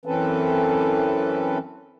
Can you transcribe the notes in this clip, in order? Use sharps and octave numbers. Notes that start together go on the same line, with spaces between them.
F#2 E3 C4 C#4 A4 B4